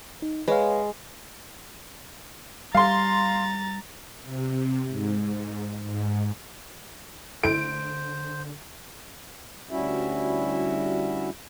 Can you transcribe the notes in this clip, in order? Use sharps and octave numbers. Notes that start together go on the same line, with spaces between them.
D#4
G#3 B4 C#5 F5
G3 F5 A#5 C6 A6
C3
G#2
G#2
D3 A3 E4 C5 D7
D2 G3 C#4 E4 F#4 E5